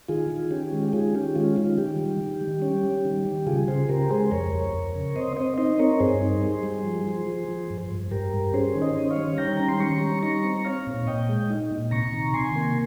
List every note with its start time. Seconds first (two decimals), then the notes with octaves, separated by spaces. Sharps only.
0.08 D#3 F4 G#4
0.30 D#3
0.51 C#4 G4
0.72 G#3
0.88 G4
0.93 D#3 F4 G#4
1.15 C#4 G4
1.36 G#3 F4
1.56 D#3 F4
1.78 G3 G4
1.99 D#3
2.20 D#3
2.41 G3
2.62 C#4
2.84 G3
3.05 D#3
3.25 G3
3.47 C#3 F4 G#4
3.68 C#3 G#4 C5
3.89 C#3 G4 A#4
4.10 G#3 G#4 C5
4.31 F2 A#4 C#5
4.53 F2
4.74 F2
4.95 C#3
5.16 C4 C5 D#5
5.37 C4 C5 D#5
5.58 D#4 C5 D#5
5.79 C4 A#4 C#5
6.00 G2 G#4 C5
6.22 D#4
6.43 G3
6.63 G3
6.85 F3
7.06 F3
7.27 F3
7.49 F3
7.70 G2
7.91 G2
8.11 G2 G4 A#4
8.33 G2
8.54 C#4 G#4 C5
8.75 D#3
8.82 C5 D#5
8.96 C#4
9.10 C#5 F5
9.17 G3
9.38 D#3 G5 A#5
9.57 C#4 A#5
9.68 C6
9.80 G3 A#5 C#6
10.02 G3
10.23 D#4 A#5 C#6
10.44 C4
10.65 C4 C#5 F5
10.87 A#2
11.07 A#2 D#5 G5
11.29 G#3
11.50 D#4
11.71 A#2
11.91 C3 A#5 C#6
12.13 D#3
12.34 C3 G#5 C6
12.56 A#3